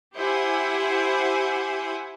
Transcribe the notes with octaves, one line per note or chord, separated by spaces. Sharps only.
E4 G4 C5 F#5 G#5